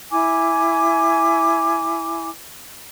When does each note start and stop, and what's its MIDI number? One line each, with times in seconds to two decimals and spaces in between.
0.11 2.29 64
0.11 2.29 80
0.11 2.29 86